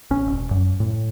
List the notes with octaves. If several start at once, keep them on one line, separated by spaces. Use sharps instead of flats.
A1 C#4
E1
F#2
A2